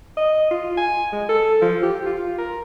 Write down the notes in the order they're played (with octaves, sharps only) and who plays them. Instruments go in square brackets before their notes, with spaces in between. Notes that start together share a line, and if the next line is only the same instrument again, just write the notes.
[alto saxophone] D#5
F4
G#5
G#3
A4
F3
G4
F4
A#4